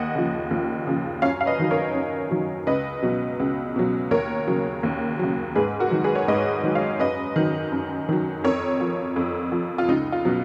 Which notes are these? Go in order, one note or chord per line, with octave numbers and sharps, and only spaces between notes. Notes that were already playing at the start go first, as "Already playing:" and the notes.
Already playing: D#2 D#5 F#5
C#3 F3
D#2
C#3 F3
F#2 C#5 F5
F5
B4 D#5
D#3 F#3
A#4 C#5
F#2
D#3 F#3
C#2 B4 D#5
B2 F#3
C#2
B2 F#3
D#2 A#4 C#5
C#3 F#3
D#2
C#3 F#3
G#2 G#4 B4
F#4 A#4
D#3 F#3
G#4 B4
C#5
G#2 B4 D#5
D#3 F#3
C#5 F5
F#2 B4 D#5
D#3 F#3
F#2
D#3 F#3
F2 A#4 C#5
F3
F2
F3
F4
C#2 D#4
F4
B2 F#3